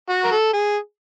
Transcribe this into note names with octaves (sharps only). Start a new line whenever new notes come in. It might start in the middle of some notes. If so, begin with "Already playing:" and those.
F#4
A#4
A4
G#4